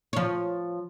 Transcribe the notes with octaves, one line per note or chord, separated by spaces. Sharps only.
F3 C#5